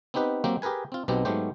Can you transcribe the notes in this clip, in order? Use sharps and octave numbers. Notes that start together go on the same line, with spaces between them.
B3 C4 D#4 G4 B4
F#3 A#3 C4 G4
G4 G#4 A#4 B4 G#5
C4 F4
B1 B2 B3 C4 G4
G#2 F#3 A3 B3 G4 C5